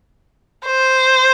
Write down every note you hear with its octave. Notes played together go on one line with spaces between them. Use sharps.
C5